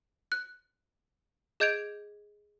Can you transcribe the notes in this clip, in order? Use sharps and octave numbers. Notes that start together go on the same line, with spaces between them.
F#6
G#4 D#5 G6 G#6 D7 F7